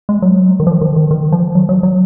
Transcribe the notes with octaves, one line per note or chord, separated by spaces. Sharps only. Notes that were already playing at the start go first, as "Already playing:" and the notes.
G#3
F#3
D#3
F3
D#3
D#3
D#3
F3
F#3
F#3
F#3